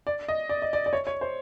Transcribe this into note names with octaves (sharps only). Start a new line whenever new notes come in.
D5
D#5
D5
D#5
D5
D5
C#5
C#5
C5